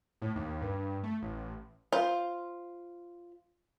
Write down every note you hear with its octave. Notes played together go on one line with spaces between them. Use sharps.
A2
D#2
G2
A3
A1
F4 C5